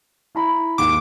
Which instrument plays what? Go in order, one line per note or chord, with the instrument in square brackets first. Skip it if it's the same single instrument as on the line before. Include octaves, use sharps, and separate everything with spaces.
[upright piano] E4 A#5 B5
[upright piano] D#2 G#2 [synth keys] D6